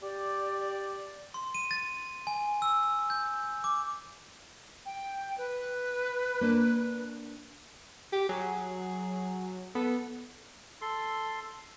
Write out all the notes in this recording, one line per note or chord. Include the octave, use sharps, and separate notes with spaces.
G4 D5
C6
D#7
A6
G#5
E6
G6
D6
G5
B4
A#3 D4
G4
F#3 G#4
B3 A4
A4 C6